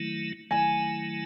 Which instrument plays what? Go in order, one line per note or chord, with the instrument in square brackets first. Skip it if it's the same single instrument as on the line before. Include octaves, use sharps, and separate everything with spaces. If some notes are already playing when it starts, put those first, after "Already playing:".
Already playing: [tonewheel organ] D#3 F#3 A3 E4
[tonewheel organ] D#3 F#3 A3 E4 [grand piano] G#5